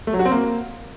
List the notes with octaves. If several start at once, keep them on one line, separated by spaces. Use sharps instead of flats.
A3
F#3
F#4
C4
A#3